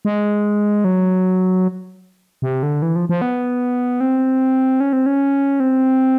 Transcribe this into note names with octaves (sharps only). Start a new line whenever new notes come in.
G#3
F#3
C3
D3
E3
F3
F3
B3
C4
C#4
C4
C#4
C4